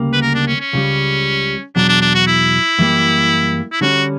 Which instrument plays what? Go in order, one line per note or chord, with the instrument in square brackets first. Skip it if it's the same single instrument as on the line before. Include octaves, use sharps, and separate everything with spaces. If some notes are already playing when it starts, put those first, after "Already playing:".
Already playing: [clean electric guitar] D2 C#3 G3 A#3
[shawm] B4
A#4
D4
C#4
C#4
[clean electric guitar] C#2 C#3 G3
[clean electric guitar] E2 B2 F#3 [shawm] D4
[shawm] D4
D4
F#4
E4
[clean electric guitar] F#2 E3 G3 A#3
[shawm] E4
[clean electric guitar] D3 G3 C#4 [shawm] F#4